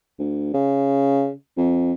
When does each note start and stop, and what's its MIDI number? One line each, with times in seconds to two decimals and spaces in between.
0.19 0.53 38
0.54 1.32 49
1.57 1.93 41